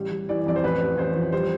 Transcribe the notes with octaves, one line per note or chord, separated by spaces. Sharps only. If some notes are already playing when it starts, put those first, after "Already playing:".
Already playing: A1 G3
G3
E3 D5
F2 D5
C5
A1 B4
A1
A1 C5
F3
G3 C5